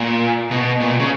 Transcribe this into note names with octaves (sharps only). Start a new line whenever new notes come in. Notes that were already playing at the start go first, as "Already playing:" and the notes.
Already playing: A#2
B2
A#2
B2
C#3